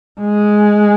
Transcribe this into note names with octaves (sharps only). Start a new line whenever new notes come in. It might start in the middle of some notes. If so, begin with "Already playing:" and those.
G#3